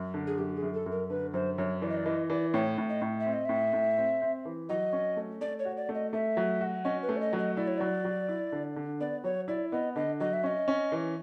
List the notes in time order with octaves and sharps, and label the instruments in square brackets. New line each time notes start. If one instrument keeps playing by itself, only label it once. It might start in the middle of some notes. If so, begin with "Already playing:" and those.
Already playing: [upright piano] F#2
D3
[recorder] G#4
[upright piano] F#2 [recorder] G4
[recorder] G#4
[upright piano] F#2
[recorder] A4
[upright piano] F#2
[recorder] A#4
[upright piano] D3 [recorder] B4
[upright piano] F#2 [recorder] C5
[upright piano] F#2 [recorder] C#5
[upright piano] E3 [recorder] D5
[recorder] D#5
D5
[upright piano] E3 [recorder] D#5
[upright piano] E3 [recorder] D5
[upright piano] A2 [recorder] C#5
[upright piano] A2
[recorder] D#5
[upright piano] A2
[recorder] E5
[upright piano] C4
[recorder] D#5
[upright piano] A2 [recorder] E5
[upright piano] A2
C4
C4
E3
[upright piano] F#3 [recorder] D#5
[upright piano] C#4
A3
[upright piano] A3 [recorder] D5
[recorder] C#5
[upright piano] F#4
[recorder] D5
[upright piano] A3
[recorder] D#5
[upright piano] A3 [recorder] E5
[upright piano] F#3
F#4
[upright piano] C#4 [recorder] D#5
[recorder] B4
[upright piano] A3
[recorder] D5
D#5
[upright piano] F#3
[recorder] D#5
[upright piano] E4 [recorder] D5
[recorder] C#5
[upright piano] F#3 [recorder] D5
[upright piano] F#3
E4
D3
D3
[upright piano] B3 [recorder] D5
[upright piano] F#3 [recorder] C#5
[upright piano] E4 [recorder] D5
[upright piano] B3 [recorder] D#5
[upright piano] D3 [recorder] D#5
[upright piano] F#3 [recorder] D#5
[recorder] E5
[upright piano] C#4 [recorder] D#5
[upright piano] C#4
E3